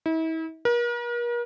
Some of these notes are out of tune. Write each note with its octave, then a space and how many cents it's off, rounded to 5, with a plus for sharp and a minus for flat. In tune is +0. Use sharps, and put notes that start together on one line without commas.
E4 -40
A#4 +40